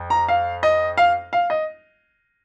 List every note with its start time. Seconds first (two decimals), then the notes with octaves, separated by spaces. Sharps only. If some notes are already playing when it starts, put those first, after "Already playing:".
Already playing: F2
0.10 A#5
0.28 F5
0.63 D#5
0.98 F5
1.33 F5
1.50 D#5